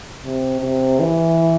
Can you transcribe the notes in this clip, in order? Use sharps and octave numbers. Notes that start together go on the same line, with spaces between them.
C3
C3
E3